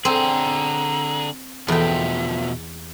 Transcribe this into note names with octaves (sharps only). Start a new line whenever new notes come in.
D3 C4 G#4 A#5
E2 B2 F3 E5 G5